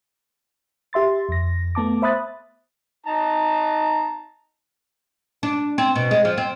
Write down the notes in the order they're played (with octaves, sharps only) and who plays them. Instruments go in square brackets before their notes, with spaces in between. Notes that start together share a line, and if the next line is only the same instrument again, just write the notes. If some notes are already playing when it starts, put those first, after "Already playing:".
[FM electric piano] G4 E5 C6 A6
F2 A#6
A3 B3 A5 D6
C5 E5 B5 D#6 F#6 A6
[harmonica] D#4 A5 A#5
[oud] D4
C4
B2
G#3
F3
C4